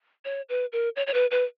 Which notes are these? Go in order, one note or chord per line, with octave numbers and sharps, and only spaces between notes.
C#5
B4
A#4
C#5
C#5
B4
B4